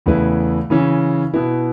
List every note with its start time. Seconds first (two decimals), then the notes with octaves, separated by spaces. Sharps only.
0.06 E2 C#3 A3 E4 B4
0.70 C#3 E3 C#4
1.34 B2 B3 E4